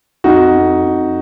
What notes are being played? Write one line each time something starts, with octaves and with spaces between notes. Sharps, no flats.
F2 D#4 F#4
F2
F2